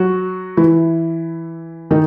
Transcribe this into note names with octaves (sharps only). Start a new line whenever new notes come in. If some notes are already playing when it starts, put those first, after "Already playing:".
Already playing: F#3 F#4
E3 E4
D#3 D#4